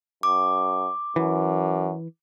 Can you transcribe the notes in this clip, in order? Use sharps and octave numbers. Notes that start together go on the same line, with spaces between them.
F#2 D6
F#2 E3